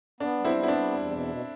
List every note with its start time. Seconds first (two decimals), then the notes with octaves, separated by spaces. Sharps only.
0.20 B3 D4
0.39 G3
0.45 C4 E4
0.56 B3
0.63 E4
0.68 D4
0.74 G3
0.92 E2
1.10 B2
1.28 B2